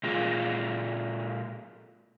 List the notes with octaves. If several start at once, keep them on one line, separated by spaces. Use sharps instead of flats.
A#2 G#3 F4